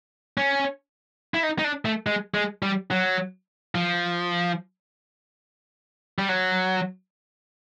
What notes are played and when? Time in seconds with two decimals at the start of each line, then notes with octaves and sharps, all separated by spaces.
0.38 C#4
1.34 E4
1.43 D#4
1.59 D#4
1.64 D4
1.85 A3
2.07 G#3
2.34 G#3
2.62 G3
2.91 F#3
3.75 F3
6.19 G3
6.29 F#3